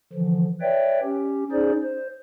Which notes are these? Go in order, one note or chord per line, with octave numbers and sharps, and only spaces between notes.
D3 E3 F3
B4 C#5 D5 E5 G5
C#4 G4
C#4 D#4 G#4 C5 D5
C5